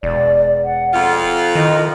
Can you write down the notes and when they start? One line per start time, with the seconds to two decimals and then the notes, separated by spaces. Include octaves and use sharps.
0.03 E1 D5
0.63 F#5
0.93 F2 F4
1.55 D#3 E4 D#5